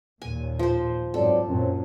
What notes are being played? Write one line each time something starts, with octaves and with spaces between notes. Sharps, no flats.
D#2 A#2 G#5
F3 C5
G#2 F#3 C4 A4 D5
F#2 A#2 C4 C#4